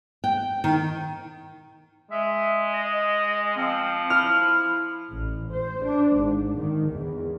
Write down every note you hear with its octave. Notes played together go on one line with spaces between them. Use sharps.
G5
D#3
G#3 E5
D#5
F3 C4
E4 F6
A1
C5
D4
G#1
D#3
E2